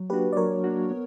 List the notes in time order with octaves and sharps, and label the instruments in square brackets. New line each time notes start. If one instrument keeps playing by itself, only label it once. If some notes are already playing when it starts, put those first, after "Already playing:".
Already playing: [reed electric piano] F#3
[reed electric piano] A#3 D4 F#4 [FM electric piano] G4 B4
[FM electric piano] D5
[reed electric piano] F#3 [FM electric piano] A#4 C#5
[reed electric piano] A#3 D4 F#4
B3